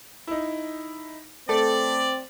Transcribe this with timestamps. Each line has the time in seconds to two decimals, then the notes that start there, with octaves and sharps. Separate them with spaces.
0.27 D#4 E4
1.49 A3 C4 A4 D5